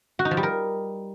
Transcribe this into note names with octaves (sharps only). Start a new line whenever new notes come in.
F#4
D#4
F3
G3
A#4